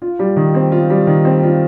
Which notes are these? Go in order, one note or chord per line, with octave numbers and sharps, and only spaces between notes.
F4
G3
D#3
C4
F4
G3
D#3
C4
F4